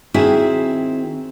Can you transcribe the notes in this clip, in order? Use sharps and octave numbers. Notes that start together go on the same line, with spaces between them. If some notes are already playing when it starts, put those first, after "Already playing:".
D#3 C4 E4 F#4 G#4